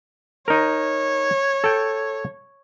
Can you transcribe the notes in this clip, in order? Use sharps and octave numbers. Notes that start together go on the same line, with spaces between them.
D#4 A#4 C#5
A4 G5